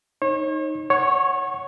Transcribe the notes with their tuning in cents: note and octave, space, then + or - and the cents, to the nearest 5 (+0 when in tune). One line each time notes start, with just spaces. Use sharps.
D#4 +0 C#5 -40
C#5 +0 F#5 +0 C#6 -35